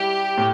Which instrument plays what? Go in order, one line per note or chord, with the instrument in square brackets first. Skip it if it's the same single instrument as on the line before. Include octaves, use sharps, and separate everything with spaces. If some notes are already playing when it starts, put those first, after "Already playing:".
Already playing: [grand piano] G3 E4 [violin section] G4
[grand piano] A2